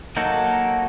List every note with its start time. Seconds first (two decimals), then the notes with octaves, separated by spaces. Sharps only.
0.17 F#3 A#3 D#4 F#4 A4